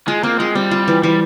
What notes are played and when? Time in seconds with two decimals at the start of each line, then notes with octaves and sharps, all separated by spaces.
0.08 G#3 F4
0.23 A#3 C4
0.39 G#3 F4
0.55 G3 C4
0.71 F4
0.88 E3
1.03 E3 G3